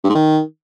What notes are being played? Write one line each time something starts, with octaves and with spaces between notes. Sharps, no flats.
G2
G#2
D#3